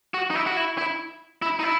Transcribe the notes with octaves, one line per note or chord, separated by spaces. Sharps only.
F#4
D#4
E4
F#4
E4
E4
E4
D#4
E4